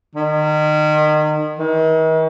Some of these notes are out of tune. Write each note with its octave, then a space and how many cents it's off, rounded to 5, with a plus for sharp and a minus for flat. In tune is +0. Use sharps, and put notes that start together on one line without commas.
D#3 -30
D#3 +45